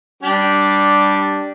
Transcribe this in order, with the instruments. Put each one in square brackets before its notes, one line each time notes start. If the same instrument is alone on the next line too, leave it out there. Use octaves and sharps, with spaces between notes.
[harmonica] G3 D4 G4